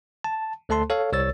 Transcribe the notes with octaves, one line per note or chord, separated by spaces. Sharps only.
A5
D2 A3 A4 A5 C6
A4 C#5 F5
C2 C#5 E6 A6